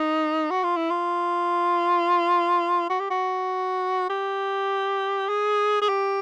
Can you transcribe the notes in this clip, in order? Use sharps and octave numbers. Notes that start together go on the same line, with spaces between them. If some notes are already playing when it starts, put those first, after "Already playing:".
Already playing: D#4
F#4
F4
E4
F4
F#4
G4
F#4
G4
G#4
G#4
G4